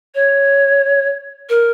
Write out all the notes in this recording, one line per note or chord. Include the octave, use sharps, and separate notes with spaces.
C#5
A#4